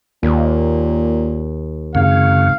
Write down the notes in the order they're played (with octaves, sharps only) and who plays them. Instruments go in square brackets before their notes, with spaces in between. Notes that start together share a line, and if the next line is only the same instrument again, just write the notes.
[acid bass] D#2 [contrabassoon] A#2
[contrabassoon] G#1 [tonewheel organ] F#2 C#3 [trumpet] F5